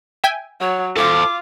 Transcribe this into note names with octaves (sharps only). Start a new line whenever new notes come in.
E5 G5 G#5
F#3 C#5
F4 A4 C5 D6